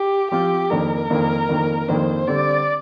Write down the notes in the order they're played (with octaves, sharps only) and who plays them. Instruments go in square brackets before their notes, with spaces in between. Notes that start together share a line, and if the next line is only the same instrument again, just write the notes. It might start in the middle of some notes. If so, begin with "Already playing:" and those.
Already playing: [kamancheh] G4
[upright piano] F3 C4 F4 [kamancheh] G4
[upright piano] F2 D#3 A#3 D4 [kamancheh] A#4
[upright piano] F2 D#3 A#3 D4
F2 D#3 A#3 D4
[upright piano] F2 D#3 A#3 D4 [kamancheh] C5
[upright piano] D3 G3 C4 [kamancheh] D5